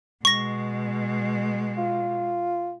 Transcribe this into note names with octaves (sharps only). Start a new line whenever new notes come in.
B2 G#3 C#6 A#6
F4